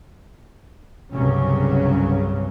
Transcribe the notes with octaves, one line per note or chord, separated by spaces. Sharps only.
C2 G2 C#3 F#3 C#4